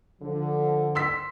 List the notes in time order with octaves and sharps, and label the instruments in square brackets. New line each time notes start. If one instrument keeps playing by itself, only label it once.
[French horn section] D3 F3
[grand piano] C6 E6 B6